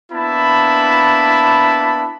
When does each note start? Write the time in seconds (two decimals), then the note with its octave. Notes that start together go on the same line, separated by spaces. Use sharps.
0.13 A#3 B3 D4 E4 A5 B5